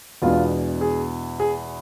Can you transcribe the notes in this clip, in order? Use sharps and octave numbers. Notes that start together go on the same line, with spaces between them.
E2 B2 G#3 B3 D4 F4
G#4
G#4